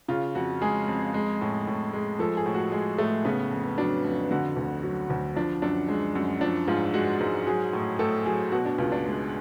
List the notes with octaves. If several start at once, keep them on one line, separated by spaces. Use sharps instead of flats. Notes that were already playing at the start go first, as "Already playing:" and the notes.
C#3 F4
F2 F#4
G#3 G#4
F2
G#3
A2
A2
G#3
F3 A4
G#4
A2
F#4
G#3
A2 A3
C#3 B3
F2
F#3 D4
F2
D3 F#4
D2
F#3
D2
F3 D4
F#2 D4
G#3
F#2
F3 D4
G#2 F4
G#3 F#4
G#2
F#3 G#4
A2
A2 A4
F#3 G#4
B2 F#4
D4
C#2 F4
D4
G#3